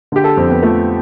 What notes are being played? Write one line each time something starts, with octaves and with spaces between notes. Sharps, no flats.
D3 G4
A4
F2 C4
B3
F3 A3